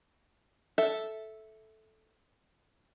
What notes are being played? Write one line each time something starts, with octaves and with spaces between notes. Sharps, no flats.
A4 E5